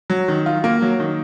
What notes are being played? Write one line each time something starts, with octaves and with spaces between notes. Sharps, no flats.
F#3
D#3
F4
A#3
F#3
D#3